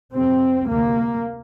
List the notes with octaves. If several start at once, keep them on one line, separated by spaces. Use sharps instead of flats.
F2 C3 C4
D2 C3 A#3